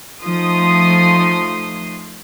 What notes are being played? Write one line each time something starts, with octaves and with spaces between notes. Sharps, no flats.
F3 A3 D#4 C6 D#6